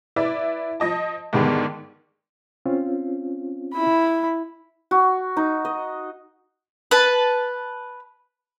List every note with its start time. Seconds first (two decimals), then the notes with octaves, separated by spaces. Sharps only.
0.16 E4 B4 D5 E5
0.80 F3 D#5 A5
1.33 G#2 D3 D#3 G3 G#3 B3
2.66 C4 C#4 F4
3.73 E4 B5
4.91 F#4
5.37 D#4
5.65 D#5
6.91 B4 A5